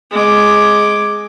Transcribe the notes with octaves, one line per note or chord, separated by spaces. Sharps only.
G#3 D6